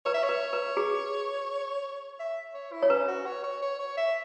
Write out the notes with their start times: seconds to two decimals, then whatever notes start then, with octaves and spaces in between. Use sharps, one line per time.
0.05 B4 C#5
0.14 E5
0.23 C#5
0.29 B4
0.53 B4
0.77 G#4
2.19 E5
2.54 C#5
2.72 E4
2.83 C#5
2.90 C#4 B4
3.08 F#4
3.26 C#5
3.43 C#5
3.62 C#5
3.79 C#5
3.97 E5